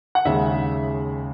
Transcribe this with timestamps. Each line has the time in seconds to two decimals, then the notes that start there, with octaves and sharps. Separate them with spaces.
0.15 F#5
0.25 D#2 C#3 G#3 E5